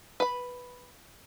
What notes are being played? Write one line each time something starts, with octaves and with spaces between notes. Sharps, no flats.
B4 B5